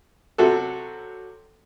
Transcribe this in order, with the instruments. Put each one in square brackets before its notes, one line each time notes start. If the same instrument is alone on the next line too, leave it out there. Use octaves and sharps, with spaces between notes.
[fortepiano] C3 F#3 F#4 A4